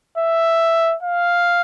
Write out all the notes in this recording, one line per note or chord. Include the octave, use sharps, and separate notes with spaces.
E5
F5